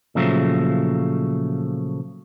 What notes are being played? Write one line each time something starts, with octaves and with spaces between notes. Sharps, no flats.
A#2 C#3 F3 F#3 A3